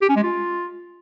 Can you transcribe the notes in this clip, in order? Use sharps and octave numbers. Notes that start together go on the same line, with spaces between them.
G4
C#4
G#3
F4